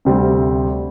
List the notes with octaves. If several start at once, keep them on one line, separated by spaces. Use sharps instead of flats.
D2 C3 G3 C4